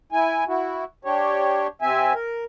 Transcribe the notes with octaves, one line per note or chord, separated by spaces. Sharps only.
E4 G#5
E4 F#4
D4 G4 C#5
C3 C4 E5 G#5
A#4